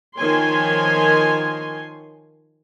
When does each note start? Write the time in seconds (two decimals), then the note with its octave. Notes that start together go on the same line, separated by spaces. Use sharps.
0.17 D#3 F3 A#4 C#5 G#5 C6